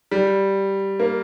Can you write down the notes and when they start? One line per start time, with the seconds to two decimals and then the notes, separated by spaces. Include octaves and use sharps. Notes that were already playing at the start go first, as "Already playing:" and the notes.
0.11 G3
1.00 A#3